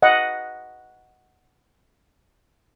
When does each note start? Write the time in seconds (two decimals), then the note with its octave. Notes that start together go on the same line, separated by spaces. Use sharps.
0.02 D#5 F#5